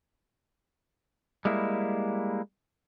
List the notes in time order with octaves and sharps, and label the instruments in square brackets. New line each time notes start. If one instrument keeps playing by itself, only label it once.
[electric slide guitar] G3 G#3 A#3 E4